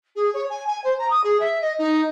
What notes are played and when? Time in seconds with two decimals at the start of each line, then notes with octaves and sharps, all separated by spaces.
0.16 G#4
0.34 C#5
0.50 G#5
0.67 G#5
0.84 C5
0.99 A#5
1.10 D#6
1.24 G#4
1.40 E5
1.62 D#5
1.79 D#4